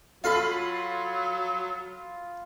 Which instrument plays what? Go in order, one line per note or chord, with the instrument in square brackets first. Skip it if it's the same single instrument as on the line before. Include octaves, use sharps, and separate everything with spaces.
[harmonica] F#3 [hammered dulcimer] F4 B5 C6 [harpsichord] A4 F5